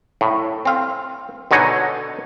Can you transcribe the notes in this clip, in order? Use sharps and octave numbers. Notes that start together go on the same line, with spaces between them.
A2
C4 F5
B2 D3 D#4 C#5 G#5